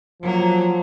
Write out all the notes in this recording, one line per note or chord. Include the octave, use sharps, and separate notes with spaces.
F3 F#3 A#3